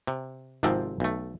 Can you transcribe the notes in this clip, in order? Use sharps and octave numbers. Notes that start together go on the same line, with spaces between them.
C3
G#1 G#2 C3 F3 C4
B1 A3